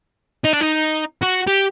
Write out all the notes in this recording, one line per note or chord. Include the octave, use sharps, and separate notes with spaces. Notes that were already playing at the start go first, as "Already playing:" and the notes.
D#4
D4
D#4
F#4
G4